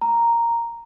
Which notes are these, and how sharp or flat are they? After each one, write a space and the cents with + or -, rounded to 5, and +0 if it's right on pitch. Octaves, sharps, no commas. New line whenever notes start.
A#5 +0